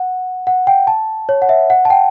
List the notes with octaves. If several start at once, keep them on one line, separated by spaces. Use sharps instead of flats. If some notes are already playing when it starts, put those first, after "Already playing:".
Already playing: F#5
F#5
G5
A5
C#5
F#5
E5
F#5
A5
G5